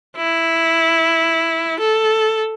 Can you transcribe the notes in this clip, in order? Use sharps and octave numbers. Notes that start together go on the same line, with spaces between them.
E4
A4